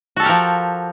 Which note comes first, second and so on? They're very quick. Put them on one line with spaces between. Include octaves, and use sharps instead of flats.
F#4 A4 G4 A#4 F3